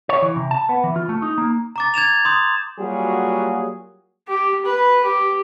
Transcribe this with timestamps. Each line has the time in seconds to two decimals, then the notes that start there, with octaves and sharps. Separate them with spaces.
0.09 C#5
0.22 E3
0.36 C3
0.51 A5
0.69 B3
0.84 E3
0.96 F4
1.09 A3
1.22 D#4
1.38 A#3
1.76 A#5 D6 A6
1.94 G#6 A6 E7 F7
2.25 C6 D#6 G6
2.79 F#3 G3 A#3 F4 F#4 G#4
4.28 G4
4.65 B4
5.04 G4